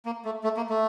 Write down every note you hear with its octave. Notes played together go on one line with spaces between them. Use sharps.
A#3
A3
A3
A#3
A3